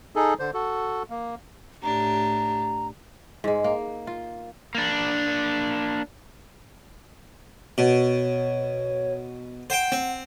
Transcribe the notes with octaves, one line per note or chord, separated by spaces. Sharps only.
D#4 G#4 A4
D3 C5
F#4 A4
A#3
A2 D4 G4 A#5
G#2 G#3
A#3
F4
A#3 D4
B2 C#5
C5 F#5 G5
C4